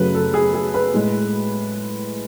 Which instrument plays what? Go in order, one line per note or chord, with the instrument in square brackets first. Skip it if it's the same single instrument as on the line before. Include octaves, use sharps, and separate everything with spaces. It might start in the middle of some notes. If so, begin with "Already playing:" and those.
Already playing: [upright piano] F#2 C#3 F#3 A3 B4
A4
G#4
G#4
B4
A2 G#3